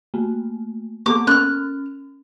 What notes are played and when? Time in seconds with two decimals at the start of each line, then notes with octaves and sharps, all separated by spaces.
0.14 A3 A#3
1.06 A#3 B3 A4 D6
1.27 C#4 F6 F#6